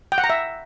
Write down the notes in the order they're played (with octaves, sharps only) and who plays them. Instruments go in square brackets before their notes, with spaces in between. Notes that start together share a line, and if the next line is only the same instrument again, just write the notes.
[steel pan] G5
F#5
A#5
E5